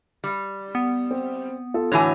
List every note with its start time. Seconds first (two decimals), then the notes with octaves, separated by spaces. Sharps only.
0.24 G3
0.75 B3
1.11 C4
1.74 F4 A4
1.92 A2 D3 E3 F#4 C#5 G#5